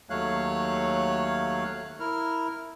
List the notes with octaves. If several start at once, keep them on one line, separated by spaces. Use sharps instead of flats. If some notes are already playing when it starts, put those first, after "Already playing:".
D#2 F#3 A3 C#5 F5 F#6
E4 A#4 F6